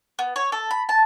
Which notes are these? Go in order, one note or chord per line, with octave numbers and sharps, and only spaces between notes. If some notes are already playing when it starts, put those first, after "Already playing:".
B3
C#5
A4
B5
A5